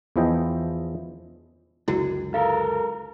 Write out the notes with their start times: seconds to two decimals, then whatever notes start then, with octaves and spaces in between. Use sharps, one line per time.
0.16 E2 E3 F3 E4 D#5 G5
1.88 C#2 F#2 D3 E4 F#4
2.34 A4 A#4 F5